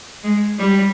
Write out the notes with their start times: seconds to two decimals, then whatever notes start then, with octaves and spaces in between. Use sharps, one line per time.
0.24 G#3
0.59 G3